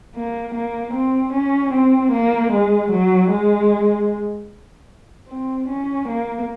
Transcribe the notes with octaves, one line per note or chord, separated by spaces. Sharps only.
A#3
A#3
C4
C#4
C4
A#3
G#3
F#3
G#3
C4
C#4
A#3